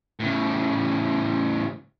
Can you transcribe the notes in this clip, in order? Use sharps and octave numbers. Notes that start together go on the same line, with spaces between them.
A2 C#3